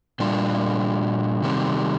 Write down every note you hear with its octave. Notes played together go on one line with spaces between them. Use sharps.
A#2 G3 D4 F4
C3 D#3 G3 C4